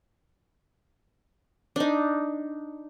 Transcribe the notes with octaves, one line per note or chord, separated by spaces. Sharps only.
D4 D#4